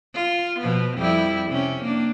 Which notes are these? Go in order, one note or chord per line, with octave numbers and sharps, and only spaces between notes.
F4
B2 F3 B3
F2 G3 E4
C3 C#4
A#3 D4